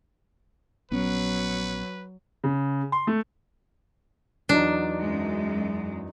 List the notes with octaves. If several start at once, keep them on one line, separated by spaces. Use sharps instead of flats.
A#1 F#3 B3 C#4 B4
C#3
C6
A3
E2 F#3 D4 D#4
F#2 G#3